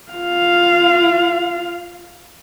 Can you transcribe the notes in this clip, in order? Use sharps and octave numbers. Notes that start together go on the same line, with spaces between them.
F4 F5